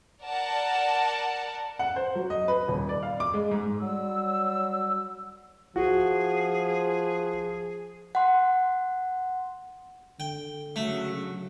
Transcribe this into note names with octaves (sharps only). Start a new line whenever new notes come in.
A#4 D5 F#5 A5
F#5
C5
F#3
D#5
B4
D#1
D5
F5
D6
G#3
G#2
F#3 G3 E6
F3 F#4 G#4
F#5 C6
D3 G5
C#3 F#3 A3